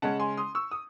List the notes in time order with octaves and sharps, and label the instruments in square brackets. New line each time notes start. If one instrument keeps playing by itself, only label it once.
[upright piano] C#3 G#3 C#4 F#5 A5
G#5 C6
C6 D#6
C#6 E6
D#6